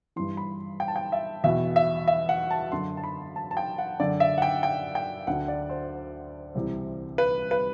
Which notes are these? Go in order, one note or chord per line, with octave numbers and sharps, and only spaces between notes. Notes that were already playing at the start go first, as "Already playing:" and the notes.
G2 E3 C6
B5
G5
A5
G5
E5
E2 B2 E5
E5
E5
F#5
A5
F#2 D3 C6
A5
B5
A5
A5
G5
F#5
F#2 D3 D5
E5
F#5
G5
G5
G5
D2 D3 F#5
D5
C5
C2 C3 E3
B4
B4